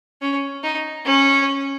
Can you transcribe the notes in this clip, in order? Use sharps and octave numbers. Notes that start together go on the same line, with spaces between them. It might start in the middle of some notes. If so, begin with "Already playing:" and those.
C#4
D#4
C#4